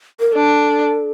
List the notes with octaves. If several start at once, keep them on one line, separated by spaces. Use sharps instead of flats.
A#4
D4 A4